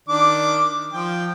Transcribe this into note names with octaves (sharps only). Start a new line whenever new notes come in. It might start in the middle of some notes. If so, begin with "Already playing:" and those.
D#3 D4 D6
F3 G5